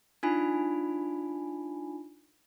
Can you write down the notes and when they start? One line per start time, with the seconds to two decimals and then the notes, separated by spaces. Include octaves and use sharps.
0.23 D4 D#4 F4 G#5 B5